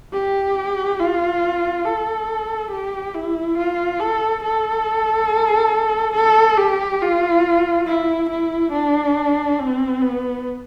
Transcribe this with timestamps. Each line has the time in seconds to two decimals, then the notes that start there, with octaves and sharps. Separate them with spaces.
0.13 G4
0.99 F4
1.85 A4
2.71 G4
3.14 E4
3.57 F4
4.00 A4
4.43 A4
6.14 A4
6.57 G4
7.01 F4
7.87 E4
8.29 E4
8.72 D4
9.59 C4
10.02 B3